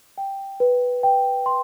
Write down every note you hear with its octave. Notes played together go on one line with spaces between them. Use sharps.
G5
B4
G5
C6